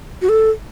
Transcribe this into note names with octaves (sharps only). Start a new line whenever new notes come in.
F#4
A4